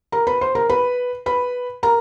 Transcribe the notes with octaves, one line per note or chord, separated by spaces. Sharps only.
A#4 A#5
B4 B5
C5 C6
A#4 A#5
B4 B5
B4 B5
A#4 A#5